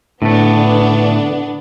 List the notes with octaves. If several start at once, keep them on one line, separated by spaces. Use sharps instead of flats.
A2 D3 A3 B3 D4